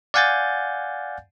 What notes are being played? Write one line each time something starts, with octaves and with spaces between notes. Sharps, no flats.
D5 F5 F#5 G#5 G6 A6